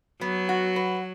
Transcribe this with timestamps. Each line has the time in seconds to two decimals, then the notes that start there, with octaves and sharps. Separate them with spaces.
0.21 F#3 B3
0.49 F#4
0.76 B4